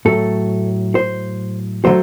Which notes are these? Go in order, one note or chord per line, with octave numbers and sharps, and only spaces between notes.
A2 F#3 A3 A4
C5
D3 F#3 A3 C5